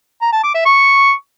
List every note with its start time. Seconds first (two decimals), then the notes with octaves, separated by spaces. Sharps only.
0.22 A#5
0.33 A5
0.44 D6
0.55 E5
0.66 C#6